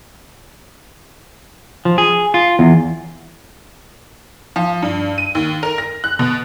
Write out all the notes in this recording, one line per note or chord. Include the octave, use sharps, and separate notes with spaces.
F3
G#4
F4
E2
F3
G2
D#7
D#2
A#4
A#6
F#6
B2